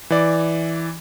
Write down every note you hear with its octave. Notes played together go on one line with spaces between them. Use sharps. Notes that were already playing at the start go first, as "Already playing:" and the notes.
E3 D5